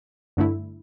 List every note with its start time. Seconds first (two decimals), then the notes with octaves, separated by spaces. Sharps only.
0.37 G1 G2 D3 A3 E4